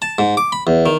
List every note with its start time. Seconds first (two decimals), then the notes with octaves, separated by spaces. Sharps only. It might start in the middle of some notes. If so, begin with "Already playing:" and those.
0.02 A5
0.18 G#2
0.37 D6
0.52 B5
0.67 E2
0.86 D#3